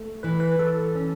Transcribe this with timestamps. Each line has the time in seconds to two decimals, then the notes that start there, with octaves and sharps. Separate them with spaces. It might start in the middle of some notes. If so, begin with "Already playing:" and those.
Already playing: A3
0.23 E3 B4
0.40 B4
0.59 E3 A4
0.95 C#4